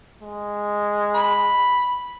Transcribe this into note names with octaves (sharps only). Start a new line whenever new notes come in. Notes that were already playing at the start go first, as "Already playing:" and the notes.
G#3
B5